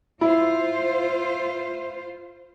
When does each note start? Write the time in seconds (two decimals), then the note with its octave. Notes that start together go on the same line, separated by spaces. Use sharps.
0.21 E4 F4 C5